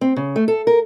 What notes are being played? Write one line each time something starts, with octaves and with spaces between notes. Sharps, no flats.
C4
C#3
A3
A4
A#4